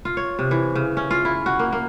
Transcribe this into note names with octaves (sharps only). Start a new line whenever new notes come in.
F4
C#5
C3
E3
C#3
C#4
F4
E4
F#4
A#3
A#3